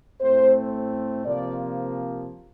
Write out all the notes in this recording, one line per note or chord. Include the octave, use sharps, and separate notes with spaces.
A2 A3 C4 C5
C3 F3 A#3 D5